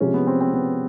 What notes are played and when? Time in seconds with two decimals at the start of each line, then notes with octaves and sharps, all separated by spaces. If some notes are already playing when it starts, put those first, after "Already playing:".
0.01 C3 F3 G#3 C#4
0.14 B3
0.27 C4
0.41 C4
0.54 B3